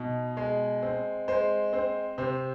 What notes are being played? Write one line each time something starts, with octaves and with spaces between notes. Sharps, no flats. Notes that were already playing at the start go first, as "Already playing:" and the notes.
Already playing: B2 D#4
G#3
C4
G#3 C5
C4 C5
C3 C5